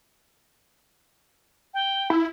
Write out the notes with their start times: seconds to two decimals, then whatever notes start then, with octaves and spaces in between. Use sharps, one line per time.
1.74 G5
2.10 E4